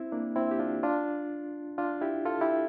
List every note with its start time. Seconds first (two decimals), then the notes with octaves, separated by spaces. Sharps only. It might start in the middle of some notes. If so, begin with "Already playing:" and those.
Already playing: C4 E4
0.12 A#3 D4
0.36 C4 E4
0.51 G4
0.59 D4 F4
0.83 D4 F4
1.78 D4 F4
2.01 E4 G4
2.26 F4 A4
2.41 E4 G4